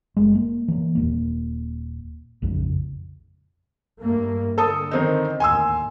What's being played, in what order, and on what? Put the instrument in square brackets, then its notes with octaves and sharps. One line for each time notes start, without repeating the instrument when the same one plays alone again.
[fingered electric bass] F#1 G3 G#3
A#3
E3 A#3
D#1 E2 A#3
A#1 F2 C#3
[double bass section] G2 A3 A#3
[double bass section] D3 [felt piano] A4 A5 D#6
[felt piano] D#3 C4 D#4
[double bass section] D#2 A2 [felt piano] G#5 C6 E6